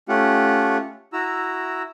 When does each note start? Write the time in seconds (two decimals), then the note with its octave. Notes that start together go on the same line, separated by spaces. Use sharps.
0.09 A3 C#4 F4 G4 F#5
1.13 E4 F#4 A#5 E6